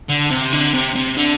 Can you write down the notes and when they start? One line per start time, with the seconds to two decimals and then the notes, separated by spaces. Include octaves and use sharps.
0.10 D3
0.31 C3
0.53 D3
0.74 C3
0.96 C3
1.17 D3